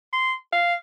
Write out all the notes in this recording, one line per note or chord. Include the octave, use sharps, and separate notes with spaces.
C6
F5